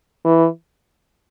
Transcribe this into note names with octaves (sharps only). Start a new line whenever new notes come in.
E3